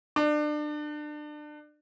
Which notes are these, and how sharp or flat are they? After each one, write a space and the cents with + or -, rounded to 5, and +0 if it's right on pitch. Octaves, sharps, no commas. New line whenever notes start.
D4 +30